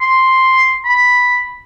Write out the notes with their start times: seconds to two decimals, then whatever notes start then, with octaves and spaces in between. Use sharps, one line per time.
0.01 C6
0.85 B5